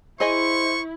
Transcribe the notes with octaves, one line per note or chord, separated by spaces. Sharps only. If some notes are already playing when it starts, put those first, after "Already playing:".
E4 G#4 C5 D#5 G#5 C#6